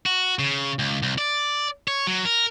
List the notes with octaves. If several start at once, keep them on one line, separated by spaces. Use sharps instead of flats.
F#4
C#3
C#2
C2
D5
C#5
F#3
A#4